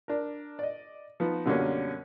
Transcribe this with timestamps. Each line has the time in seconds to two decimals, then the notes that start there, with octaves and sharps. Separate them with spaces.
0.08 D4 A#4
0.59 D5 D#5
1.20 F3 B3 D#4
1.45 F#2 B2 D3 G3 A#3 C#4